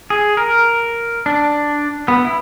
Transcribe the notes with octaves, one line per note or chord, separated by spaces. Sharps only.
G#4
A#4
D4
B3
E4